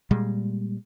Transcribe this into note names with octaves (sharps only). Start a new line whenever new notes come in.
A#2 G3 G#3